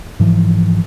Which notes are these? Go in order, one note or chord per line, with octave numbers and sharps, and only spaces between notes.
G#2 E3 F3